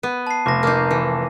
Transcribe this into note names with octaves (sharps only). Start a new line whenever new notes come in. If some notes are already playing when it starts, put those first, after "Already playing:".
B3 D#7
A5 C7
F1 D6 A#6
A#3 D#4
E3